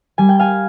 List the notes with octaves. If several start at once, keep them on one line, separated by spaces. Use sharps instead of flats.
G3 G#5
G5
F5 G#5